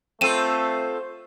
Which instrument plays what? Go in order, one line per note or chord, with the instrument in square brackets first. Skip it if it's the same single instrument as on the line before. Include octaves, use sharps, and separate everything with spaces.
[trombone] A3 [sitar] C4 F4 A4 [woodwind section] C5 [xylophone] D#7 E7